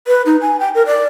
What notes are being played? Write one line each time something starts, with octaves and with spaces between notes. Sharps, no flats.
B4
D#4
G#5
G5
A#4
D5